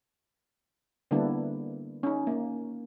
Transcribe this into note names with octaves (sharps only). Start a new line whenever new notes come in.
D3 G3 A#3 B3 D4 E4
C#4 D#4
A#3 C#4